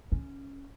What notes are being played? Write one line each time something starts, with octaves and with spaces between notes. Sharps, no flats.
C#4